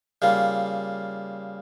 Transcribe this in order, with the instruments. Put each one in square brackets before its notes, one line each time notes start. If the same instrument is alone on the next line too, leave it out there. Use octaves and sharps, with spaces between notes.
[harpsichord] C#3 G3 A#3 F4